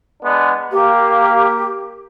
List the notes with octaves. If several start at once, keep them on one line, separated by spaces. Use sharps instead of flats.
G#3 B3 D4
A#3 G4